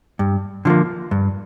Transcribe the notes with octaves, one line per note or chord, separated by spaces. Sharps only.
G2
D3 F3 A#3
G2